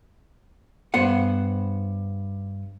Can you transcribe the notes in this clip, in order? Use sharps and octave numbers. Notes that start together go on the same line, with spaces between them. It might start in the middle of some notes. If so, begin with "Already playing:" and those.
G2 B3 C5 F#5